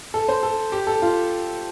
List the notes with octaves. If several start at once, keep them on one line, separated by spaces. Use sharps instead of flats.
A4
C5
A4
G4
A4
F4